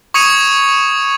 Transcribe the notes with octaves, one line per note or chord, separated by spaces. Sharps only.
C#6 D#6 G#6 C#7 D#7 F7